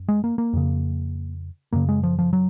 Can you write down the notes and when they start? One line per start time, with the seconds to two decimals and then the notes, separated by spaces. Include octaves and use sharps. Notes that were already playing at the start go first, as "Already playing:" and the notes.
Already playing: F#2
0.08 G#3
0.24 A#3
0.38 A#3
0.53 F2 C#3
1.72 F#2 C#3 A#3
1.89 G#3
2.03 F3
2.19 F3
2.33 F#3